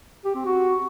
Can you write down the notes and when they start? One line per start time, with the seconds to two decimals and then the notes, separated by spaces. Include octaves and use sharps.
0.25 G4
0.35 C4
0.46 F#4